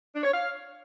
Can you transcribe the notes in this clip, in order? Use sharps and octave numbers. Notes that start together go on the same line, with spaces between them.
D4
C#5
F5